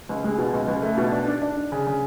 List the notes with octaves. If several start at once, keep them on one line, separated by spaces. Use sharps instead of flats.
C#2
G#3
B2
C#2
C#2
A3
B2
D4
D4
D4
D4
C#3
C#3